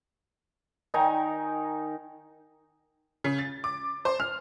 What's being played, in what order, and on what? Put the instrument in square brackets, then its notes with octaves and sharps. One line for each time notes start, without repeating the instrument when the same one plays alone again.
[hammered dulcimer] D#3 D#4 G#5 A#5
[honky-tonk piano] C#3
A6
D6
C5
F6